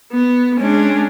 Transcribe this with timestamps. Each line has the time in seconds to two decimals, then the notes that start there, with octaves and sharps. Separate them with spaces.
0.12 B3
0.58 G#3 C#4 D4 G#4